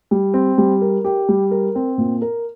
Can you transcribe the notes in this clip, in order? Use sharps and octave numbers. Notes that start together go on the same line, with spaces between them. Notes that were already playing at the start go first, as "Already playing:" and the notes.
G3
C4
G3
A#4
G4
G3
A#4
C4
A#2
A#4